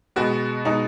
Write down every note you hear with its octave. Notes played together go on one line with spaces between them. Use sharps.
B2 G#3 B3 F#4
B2 G#3 B3 D#4